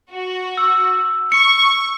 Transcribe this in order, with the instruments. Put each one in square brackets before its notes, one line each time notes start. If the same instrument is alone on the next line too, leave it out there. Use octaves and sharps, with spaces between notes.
[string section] F#4
[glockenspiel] E6
[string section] C#6 [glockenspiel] C#7